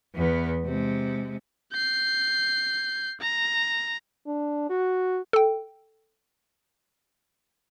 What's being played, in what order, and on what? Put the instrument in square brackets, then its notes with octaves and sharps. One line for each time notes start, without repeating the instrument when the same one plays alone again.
[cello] E2 B3
C3 G#3
[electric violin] G6 C7
A#5
[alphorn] D4
F#4
[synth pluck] A4 G5